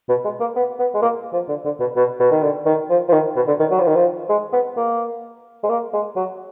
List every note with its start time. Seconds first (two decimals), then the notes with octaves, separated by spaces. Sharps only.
0.09 B2
0.25 G#3
0.40 A#3
0.56 B3
0.79 B3
0.95 G#3
1.02 A#3
1.33 F3
1.49 D3
1.65 D3
1.80 B2
1.96 B2
2.20 B2
2.31 D#3
2.43 D3
2.66 D#3
2.90 F3
3.08 F3
3.13 D#3
3.36 B2
3.48 D3
3.60 D#3
3.71 F#3
3.80 F3
3.87 D#3
3.95 F3
4.30 G#3
4.53 B3
4.77 A#3
5.64 G#3
5.70 A#3
5.93 G#3
6.16 F#3